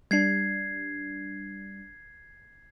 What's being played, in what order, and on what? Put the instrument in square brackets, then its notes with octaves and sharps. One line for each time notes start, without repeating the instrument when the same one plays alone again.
[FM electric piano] G3 D4 [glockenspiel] G#6 C7